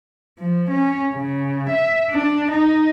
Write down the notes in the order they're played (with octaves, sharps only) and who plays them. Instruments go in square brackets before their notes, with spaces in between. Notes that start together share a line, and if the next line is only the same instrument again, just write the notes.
[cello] F3
C#4
C#3
E5
D4
D#4